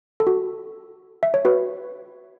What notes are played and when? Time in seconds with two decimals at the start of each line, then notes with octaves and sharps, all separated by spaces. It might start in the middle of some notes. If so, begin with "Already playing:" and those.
0.20 A4
0.27 F#4
1.23 E5
1.34 C#5
1.45 F#4 B4